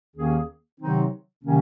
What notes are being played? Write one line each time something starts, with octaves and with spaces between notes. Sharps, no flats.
D#2 D#3 A#3 C#4 G#4
C3 D#3 F#3 C4 D#4
C3 D#3 F#3 A#3 C#4